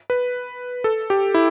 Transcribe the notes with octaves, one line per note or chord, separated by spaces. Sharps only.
B4
A4
G4
E4